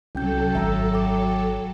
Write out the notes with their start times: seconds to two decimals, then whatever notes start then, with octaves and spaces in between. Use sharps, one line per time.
0.15 C2 F#3 C#4 A4 G5 G6
0.55 G#1 E5 A#5 E6
0.94 G5 D6